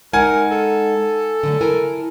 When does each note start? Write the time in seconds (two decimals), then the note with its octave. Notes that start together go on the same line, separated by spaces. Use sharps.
0.13 G#3 D#4 A#4 F#5 G#5
0.51 A4
1.43 D3 F#3 A3
1.61 E4 A#4 G#5